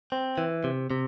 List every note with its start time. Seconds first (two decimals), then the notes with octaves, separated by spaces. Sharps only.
0.12 C4
0.38 E3
0.64 C3
0.91 C3